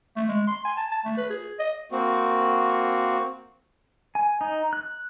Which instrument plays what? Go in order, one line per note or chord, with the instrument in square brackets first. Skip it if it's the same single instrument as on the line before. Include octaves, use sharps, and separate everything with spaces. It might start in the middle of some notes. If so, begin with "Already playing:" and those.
[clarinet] A3
G#3
C6
G#5
A5
A5
A3
B4
G#4
D#5
[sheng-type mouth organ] A#3 C4 F#4
[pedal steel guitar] G#5
D#4
F#6